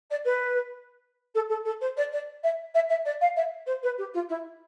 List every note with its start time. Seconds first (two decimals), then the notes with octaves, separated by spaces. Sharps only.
0.10 D5
0.25 B4
1.34 A4
1.49 A4
1.64 A4
1.81 C5
1.96 D5
2.12 D5
2.43 E5
2.74 E5
2.89 E5
3.05 D5
3.21 F5
3.36 E5
3.66 C5
3.83 B4
3.98 G4
4.13 F4
4.29 E4